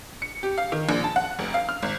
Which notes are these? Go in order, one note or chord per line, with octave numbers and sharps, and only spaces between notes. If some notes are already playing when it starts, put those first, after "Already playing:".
C#7
G4
F5
D#3
A#1
A5
F#5
F1
F5
F6
G#1